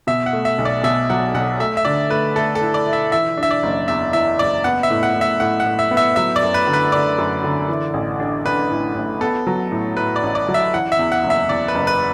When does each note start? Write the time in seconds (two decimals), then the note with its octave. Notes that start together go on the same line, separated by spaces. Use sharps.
0.07 B2 E5
0.26 F#5
0.33 A3
0.45 E5
0.58 B1
0.65 D5
0.83 B2 E5
1.10 F#3 F#5
1.34 B1 F#5
1.60 A3 E5
1.77 E5
1.85 D3 D5
2.10 A3 B4
2.36 A3 A4
2.55 A4
2.61 E4
2.74 D5
2.87 E4
2.93 E5
3.12 E3 E5
3.37 D4
3.43 E5
3.51 D5
3.63 F#1
3.88 E2 E5
4.13 E3 E5
4.39 F#1 D5
4.64 B3 F#5
4.83 E5
4.90 A2
5.03 F#5
5.15 A2
5.21 E5
5.40 A2 F#5
5.60 F#5
5.66 A2
5.79 E5
5.91 B3
5.97 E5
6.16 F#3 E5
6.36 D5
6.42 F#2
6.54 B4
6.67 D3
6.73 B4
6.92 D3 D5
7.18 F#2
7.44 D3
7.68 E3
7.94 A1
8.20 D4
8.46 D4 B4
8.70 A2
8.95 A1
9.21 B3 A4
9.47 F#3
9.72 A2
9.97 A2 B4
10.16 D5
10.23 A1
10.35 D5
10.48 F#3
10.54 E5
10.74 E3 F#5
10.92 E5
10.99 E2
11.12 F#5
11.24 F#1
11.30 E5
11.49 E2 D5
11.68 B4
11.75 F#1
11.87 B4